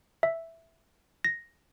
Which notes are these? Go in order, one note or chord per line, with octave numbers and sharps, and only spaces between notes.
E5
A#6